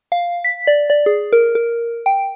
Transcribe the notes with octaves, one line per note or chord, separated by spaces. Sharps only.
F5
B6
D5
D5
G#4
A#4
A#4
G5